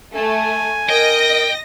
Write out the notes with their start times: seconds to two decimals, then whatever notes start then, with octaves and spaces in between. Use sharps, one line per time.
0.15 A3 G#5
0.89 A#4 D#5 G5 A#6